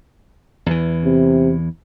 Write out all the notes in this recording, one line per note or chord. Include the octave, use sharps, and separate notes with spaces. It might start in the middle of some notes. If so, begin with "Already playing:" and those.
E2 E3
C3